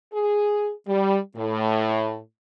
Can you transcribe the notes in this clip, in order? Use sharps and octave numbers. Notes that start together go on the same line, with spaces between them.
G#4
G3
A2